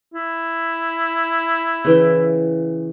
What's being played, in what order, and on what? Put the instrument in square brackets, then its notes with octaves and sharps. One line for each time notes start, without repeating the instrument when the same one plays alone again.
[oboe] E4
[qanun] C#3 E3 G5